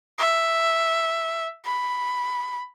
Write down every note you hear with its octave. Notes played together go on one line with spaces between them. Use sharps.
E5
B5